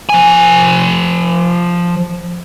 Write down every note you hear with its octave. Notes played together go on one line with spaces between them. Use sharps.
F3 G#5